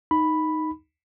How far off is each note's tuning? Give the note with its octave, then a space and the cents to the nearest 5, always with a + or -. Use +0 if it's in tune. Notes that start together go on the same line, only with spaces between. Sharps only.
D#4 +0 B5 +0